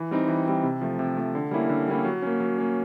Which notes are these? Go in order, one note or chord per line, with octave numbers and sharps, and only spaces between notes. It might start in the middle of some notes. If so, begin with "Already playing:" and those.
Already playing: E3
G3 C4 D#4
E3
G3 C4 D#4
C3
F3 A3
C3
F3 A3
D3
G3 A#3 C#4 E4
D3
G3 A#3 C#4 E4
F#3
A#3 C#4
F#3
A#3 C#4